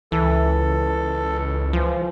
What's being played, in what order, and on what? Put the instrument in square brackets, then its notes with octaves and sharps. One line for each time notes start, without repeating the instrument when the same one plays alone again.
[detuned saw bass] C#2 [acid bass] E3 [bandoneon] A4
[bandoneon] E3 [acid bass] F3